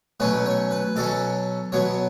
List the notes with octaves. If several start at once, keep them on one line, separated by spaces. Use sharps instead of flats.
B2 F#3 A3 C#4 B4
C#5
B4
B2 F#3 C#4 A4
B2 F#3 B3 C#5